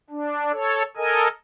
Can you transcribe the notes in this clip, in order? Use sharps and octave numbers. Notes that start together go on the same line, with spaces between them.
D4
A4 C#5
A4 A#4 D#5 G#5